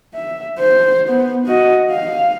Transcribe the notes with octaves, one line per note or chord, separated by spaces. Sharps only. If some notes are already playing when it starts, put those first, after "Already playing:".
E5
C5
B3
F#4 D#5
F5